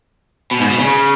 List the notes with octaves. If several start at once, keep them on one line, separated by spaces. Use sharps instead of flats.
B2
G#2
B2
C#3